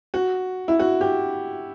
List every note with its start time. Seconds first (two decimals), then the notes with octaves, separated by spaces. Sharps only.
0.14 F#4
0.68 E4
0.79 F#4
1.01 G4